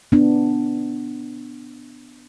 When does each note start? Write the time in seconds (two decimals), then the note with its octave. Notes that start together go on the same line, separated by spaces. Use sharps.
0.12 B3 D4